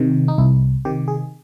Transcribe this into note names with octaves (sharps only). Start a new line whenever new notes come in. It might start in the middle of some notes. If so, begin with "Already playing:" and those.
Already playing: C3 D#3
D#4
C2 E4
C3 D#3 G4
G#4